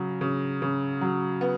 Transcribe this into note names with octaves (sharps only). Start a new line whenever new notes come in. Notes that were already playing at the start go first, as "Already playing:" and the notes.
Already playing: C#3 F#3
C#3
C#3
F#3
B3